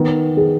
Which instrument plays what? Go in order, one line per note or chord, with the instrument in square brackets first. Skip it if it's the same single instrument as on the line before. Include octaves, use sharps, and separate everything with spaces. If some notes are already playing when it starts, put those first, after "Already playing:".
Already playing: [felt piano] D#3 [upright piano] B3
[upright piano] G#4